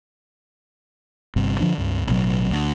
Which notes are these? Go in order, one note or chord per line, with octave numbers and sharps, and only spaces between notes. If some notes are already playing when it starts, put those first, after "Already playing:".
G1 G2 C3
D3 F3 G#3 D4
C#2 G2
A1 B2 F3 F#3
D2